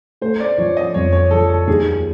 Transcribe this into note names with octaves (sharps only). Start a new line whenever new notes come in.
A3 C5
D5
F3 C#5
D#5
F2 C#5
C#5
F3 A4
A4
D#2 G#4